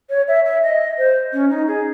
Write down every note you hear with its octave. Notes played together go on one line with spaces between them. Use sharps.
C#5
E5
E5
D#5
C5
C#4
D#4
G#4